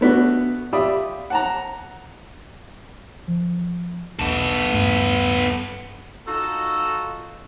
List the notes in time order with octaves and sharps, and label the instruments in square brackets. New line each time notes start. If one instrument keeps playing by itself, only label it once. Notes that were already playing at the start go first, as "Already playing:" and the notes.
[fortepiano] A3 B3 D4 F#4
F4 G4 D5 E5 B5 D#6
F#5 A5 A#5
[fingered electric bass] F3
[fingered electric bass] E1 B1 [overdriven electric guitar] B3 A4
[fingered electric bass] D#1 G2 A3
[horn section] D#4 F4 F#4 A4